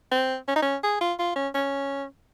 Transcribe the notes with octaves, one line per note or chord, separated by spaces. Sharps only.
C4
C#4
D#4
C#4
G#4
F4
F4
C#4
C#4